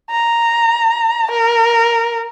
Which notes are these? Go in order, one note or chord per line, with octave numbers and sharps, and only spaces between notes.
A#5
A#4